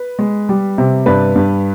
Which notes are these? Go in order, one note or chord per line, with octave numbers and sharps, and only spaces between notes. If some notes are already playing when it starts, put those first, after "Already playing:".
Already playing: B4
G#3
G3
C3
G2 B4 D5
G2